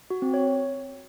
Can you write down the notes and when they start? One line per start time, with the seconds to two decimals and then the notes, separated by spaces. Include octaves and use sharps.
0.10 F#4
0.22 C4
0.34 C#5